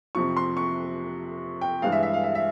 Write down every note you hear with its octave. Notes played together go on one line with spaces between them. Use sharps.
F2 C3 F3 C#6
C6
C#6
G5
G2 E3 G#3 F5
E5
E5
F5
E5
E5